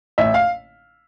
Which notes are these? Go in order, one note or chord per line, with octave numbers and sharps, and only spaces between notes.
A1 E5
F5